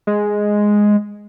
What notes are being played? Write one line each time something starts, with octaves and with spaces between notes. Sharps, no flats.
G#3